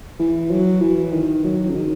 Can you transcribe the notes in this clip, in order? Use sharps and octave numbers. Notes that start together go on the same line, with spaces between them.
E3
F#3
E3
D#3
F#3
C#3
D#3